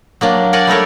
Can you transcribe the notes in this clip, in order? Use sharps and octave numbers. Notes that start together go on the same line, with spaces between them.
F#3 A#3 D4
A#4 D5 F#5 G#5
G3 A3 A4 A#4 C#5